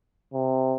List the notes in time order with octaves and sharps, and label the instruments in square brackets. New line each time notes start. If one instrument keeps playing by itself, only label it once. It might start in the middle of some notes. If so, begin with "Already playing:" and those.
[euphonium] C3